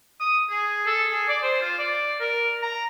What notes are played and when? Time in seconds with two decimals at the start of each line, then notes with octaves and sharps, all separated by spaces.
0.20 D#6
0.50 G#4
0.86 A4
1.10 G#4
1.28 D5
1.43 C5
1.62 F4
1.78 D5
2.20 A#4
2.62 A#5